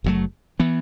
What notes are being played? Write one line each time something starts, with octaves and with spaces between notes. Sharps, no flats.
F#1 F#2 F#3 A3
E3 B3